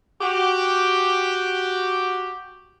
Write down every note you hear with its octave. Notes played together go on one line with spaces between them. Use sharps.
F#4 G4